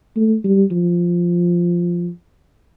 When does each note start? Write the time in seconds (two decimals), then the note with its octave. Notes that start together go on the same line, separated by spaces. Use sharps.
0.16 A3
0.44 G3
0.72 F3